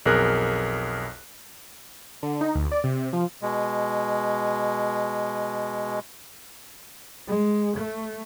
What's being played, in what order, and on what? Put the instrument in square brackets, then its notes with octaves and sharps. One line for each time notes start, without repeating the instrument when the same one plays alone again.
[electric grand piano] B1 F2 G#4 A#4 F#6
[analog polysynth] D3
D#4
D2
D5
C3
F3
[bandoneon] B2 G#3
[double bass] G#3
A3